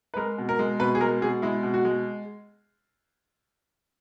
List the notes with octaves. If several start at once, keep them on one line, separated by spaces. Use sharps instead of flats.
B4
G#3 A#4
B2
A#4
G#3
B2 B4
G#4
G#3 A#4
B2 G#4
G#3 E4
B2
F#4
G#3